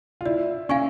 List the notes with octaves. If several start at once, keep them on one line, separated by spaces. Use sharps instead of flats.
F4
E4 D5
C#4 F5 G#5 C#6